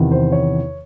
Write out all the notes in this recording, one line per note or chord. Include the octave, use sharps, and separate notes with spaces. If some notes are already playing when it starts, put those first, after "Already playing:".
Already playing: E2 C3 D#3
C5
C#5